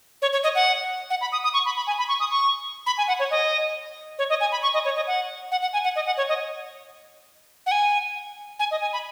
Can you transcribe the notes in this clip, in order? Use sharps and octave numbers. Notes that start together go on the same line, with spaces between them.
C#5
C#5
D#5
F#5
F#5
B5
D#6
D#6
C#6
B5
B5
G#5
B5
C#6
D#6
C#6
B5
G#5
F#5
C#5
D#5
C#5
D#5
G#5
B5
C#6
D#5
C#5
D#5
F#5
F#5
F#5
G#5
F#5
D#5
F#5
C#5
D#5
F#5
G#5
G#5
D#5
G#5
B5